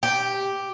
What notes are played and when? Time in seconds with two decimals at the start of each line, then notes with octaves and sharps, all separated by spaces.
0.03 G4